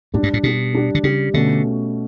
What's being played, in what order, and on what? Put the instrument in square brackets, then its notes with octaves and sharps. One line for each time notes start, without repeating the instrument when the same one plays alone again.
[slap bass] A2 [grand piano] G3 D4 G4
[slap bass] G2
A2
[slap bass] B2 [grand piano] G3 D4 G4
[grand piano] G3 D4 G4
[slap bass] D3
[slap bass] C#3 [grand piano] G3 D4 G4
[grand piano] B2 A3 C#4 [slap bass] D3